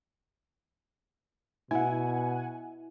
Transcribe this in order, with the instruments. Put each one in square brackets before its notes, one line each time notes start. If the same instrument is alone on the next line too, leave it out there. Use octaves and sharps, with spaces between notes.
[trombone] B2 [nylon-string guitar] E4 [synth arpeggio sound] F#5 G#5